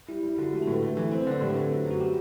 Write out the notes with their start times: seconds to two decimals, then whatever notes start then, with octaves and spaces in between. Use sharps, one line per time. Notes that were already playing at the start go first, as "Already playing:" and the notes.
0.09 G3 E4
0.23 G3 E4
0.38 D3 F#4
0.53 A3 G4
0.62 A2 A4
0.72 B4
0.82 A3
0.97 E3
1.11 C4 B4
1.22 C5
1.27 D3 D5
1.41 A2 G4
1.50 B4
1.56 C4 A4
1.71 F#3
1.86 F#2 F#4
2.00 G3 G4